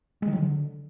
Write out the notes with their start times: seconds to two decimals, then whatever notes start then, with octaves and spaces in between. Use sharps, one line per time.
0.22 G#3
0.27 D#3
0.33 F#3
0.38 D3